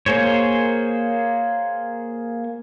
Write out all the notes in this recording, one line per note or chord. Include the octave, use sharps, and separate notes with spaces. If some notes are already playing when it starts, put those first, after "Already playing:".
A#3 G#4 C5 C#5